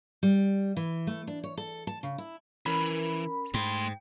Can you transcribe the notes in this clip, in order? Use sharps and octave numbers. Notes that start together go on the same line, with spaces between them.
G3
E3
A3
D4
C#5
A4
A5
C#3
E4
E3 C#4 A#4 B5
G#2 A3 G5 C6